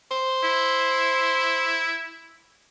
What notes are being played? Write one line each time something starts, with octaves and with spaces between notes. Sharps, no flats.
C5
E4